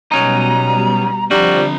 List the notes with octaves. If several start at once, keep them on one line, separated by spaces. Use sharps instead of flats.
B2 F#3 G3 C#4 D#4 A#5
D3 F3 G3 C4 D4 F#4 A#5